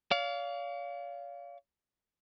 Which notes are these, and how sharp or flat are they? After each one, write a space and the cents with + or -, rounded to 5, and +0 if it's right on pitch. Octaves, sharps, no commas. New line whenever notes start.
C#5 +45 F5 +0